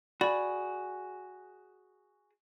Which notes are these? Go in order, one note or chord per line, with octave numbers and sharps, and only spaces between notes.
F#4 G#4 D5 B5